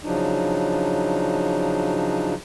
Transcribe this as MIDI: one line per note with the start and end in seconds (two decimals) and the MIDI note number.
0.03 2.34 49
0.03 2.34 53
0.03 2.34 54
0.03 2.34 62
0.03 2.34 63